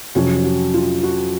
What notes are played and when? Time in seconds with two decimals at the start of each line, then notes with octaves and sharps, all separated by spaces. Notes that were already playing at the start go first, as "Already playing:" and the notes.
0.15 F2 C3 F#3 C#4 F#4
0.44 F#4
0.74 F4
1.03 F#4